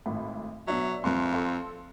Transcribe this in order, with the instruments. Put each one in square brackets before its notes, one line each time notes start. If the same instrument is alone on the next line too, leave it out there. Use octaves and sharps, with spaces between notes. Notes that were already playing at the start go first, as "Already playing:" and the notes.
[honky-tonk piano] G#1 A2 B5
[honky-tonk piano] B2 D4 E5 [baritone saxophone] F#3
[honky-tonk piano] C2 C6 [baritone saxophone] F2
[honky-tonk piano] A4 F5 C6